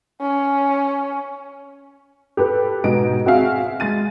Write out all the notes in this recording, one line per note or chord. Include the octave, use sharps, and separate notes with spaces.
C#4
G4 A4 B4
G#2 B2 D#5 D7
C4 F#4 G#4 E5 F5
G#3 A6 D#7